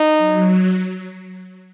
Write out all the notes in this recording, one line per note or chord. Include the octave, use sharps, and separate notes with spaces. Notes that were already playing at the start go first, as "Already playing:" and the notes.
Already playing: D#4
F#3